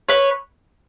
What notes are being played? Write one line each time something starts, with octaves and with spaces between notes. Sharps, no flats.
B4 C#5